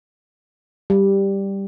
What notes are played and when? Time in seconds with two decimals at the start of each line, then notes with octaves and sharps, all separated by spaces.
0.90 G3